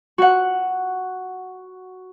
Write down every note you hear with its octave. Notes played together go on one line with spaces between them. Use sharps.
F#4 F#5